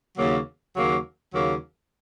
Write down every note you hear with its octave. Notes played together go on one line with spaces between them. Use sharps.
D#2 C#3 F#3 A#3
D#2 C#3 F#3 A#3
D#2 C#3 F#3 A#3